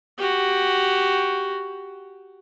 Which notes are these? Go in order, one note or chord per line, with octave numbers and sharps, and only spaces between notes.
F#4 G4